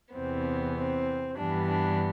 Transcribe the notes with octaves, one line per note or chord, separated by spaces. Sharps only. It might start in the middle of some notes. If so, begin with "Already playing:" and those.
E2 C3 E3 B3 C4
C4
G2 E3 G3 B3 D4
D4